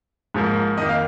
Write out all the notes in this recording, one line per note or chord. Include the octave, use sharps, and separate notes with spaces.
G#2 F3 A#3
F2 D#3 A#3 D#5
F5